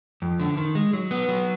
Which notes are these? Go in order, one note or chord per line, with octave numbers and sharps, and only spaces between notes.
F2
D3
D#3
G#3
F#3
B3
F#3